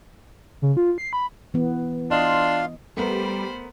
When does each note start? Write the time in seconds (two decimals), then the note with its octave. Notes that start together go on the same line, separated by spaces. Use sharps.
0.62 C#3
0.77 F4
0.98 C7
1.13 B5
1.54 E3 B3
2.11 D4 F4 D#5 F5 C6
2.97 G3 A3 B3 A#4 C5 B5